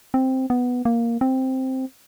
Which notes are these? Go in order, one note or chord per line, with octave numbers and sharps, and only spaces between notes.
C4
B3
A#3
C4